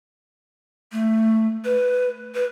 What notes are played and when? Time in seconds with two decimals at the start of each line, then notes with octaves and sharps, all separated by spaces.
0.92 A3
1.65 B4
2.35 B4